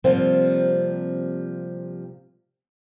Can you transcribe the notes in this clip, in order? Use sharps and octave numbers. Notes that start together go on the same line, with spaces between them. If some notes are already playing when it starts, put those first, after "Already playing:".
C3 F3 G3 A#3 C4